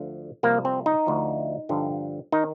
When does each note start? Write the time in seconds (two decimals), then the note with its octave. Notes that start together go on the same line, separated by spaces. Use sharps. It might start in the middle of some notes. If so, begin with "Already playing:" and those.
Already playing: D2 D3 F3
0.43 C2 C3 F3 A#3
0.65 C4
0.86 D#4
1.07 D2 D3 F3
1.69 G2 D3 F3
2.32 D#3 D#4